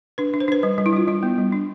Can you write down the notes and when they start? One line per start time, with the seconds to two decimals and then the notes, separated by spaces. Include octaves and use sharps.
0.18 D4 B4
0.34 D4
0.40 C5
0.48 D4 B4
0.63 G3 B4
0.78 G3
0.86 E4
0.93 G3 F4
1.07 G3 E4
1.23 B3
1.38 G3
1.52 D4